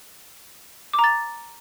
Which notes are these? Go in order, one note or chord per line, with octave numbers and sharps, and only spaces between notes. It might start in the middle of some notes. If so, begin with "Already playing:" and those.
D6
A#5
A6